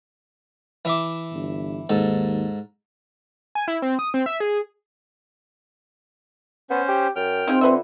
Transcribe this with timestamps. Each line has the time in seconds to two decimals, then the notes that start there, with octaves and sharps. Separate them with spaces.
0.85 E3 E5 D6
1.32 G1
1.89 D#2 G#2 A4
3.55 G#5
3.68 E4
3.82 C4
3.99 D#6
4.14 C4
4.26 E5
4.40 G#4
6.70 B3 C#4 C5
6.88 G4
7.16 F#2 G5 F6
7.48 C4 D#4 F4 G#4
7.61 D3 F4 B4 E5